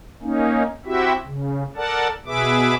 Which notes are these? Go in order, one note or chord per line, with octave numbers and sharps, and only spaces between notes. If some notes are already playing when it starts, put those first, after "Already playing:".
A#3 C#4 D#4
C4 E4 F#4 G4 E5
C#3
A4 A#4 D5 F#5 A5
B2 G#4 B4 E5 D6